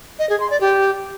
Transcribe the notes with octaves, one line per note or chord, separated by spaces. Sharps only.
D#5
G#4
C6
D5
G4